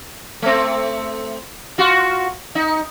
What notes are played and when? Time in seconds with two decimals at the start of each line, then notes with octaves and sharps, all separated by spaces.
0.42 A3 C4
1.78 F4 F#4
2.55 D#4